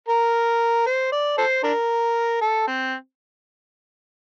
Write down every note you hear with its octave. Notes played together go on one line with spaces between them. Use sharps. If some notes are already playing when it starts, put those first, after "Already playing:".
A#4
C5
D5
A4 C5
D4 A#4
A4
C4